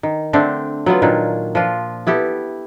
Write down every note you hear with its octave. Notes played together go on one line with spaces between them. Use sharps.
D#3
D3 A3 C4 D4
F#3 B3 F4
A#2 D#3 D4
F3 D4 F4
B3 E4 G4 A4